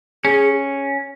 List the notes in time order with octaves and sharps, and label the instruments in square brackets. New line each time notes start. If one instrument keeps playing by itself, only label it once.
[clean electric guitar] C#4 [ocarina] G#4